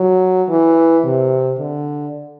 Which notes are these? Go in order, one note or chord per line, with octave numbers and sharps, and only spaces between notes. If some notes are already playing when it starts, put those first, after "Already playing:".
Already playing: F#3
E3
C3
D3